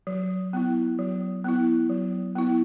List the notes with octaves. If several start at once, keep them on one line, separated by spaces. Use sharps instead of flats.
F#3
B3 E4
F#3
B3 E4
F#3
B3 E4